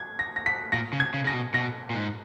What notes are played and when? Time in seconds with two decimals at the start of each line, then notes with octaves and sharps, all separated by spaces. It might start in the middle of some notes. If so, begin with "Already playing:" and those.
Already playing: G#6
0.19 A#6
0.36 A#6
0.46 B6
0.72 A#2 A#6
0.93 C#3
1.00 G#6
1.14 C#3
1.25 C#3 A#6
1.34 B2
1.54 B2 A#6
1.90 A#2
1.95 G#2